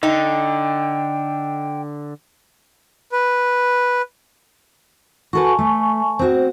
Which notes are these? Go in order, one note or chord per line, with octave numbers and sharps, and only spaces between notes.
D3 D#4 G5
B4
F#4 A4 B4 G#5 A5 C#6
A3
C4 F#4 C5